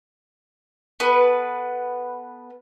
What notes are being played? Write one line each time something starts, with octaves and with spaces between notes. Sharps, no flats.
B3 A4 B4